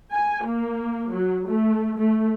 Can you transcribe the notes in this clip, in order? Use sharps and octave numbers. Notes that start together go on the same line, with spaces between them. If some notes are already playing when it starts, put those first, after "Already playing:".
G#5
A#3
F#3
A3
A3